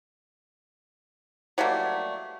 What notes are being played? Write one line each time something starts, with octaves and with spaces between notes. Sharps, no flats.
F#3 G3 A3 A#3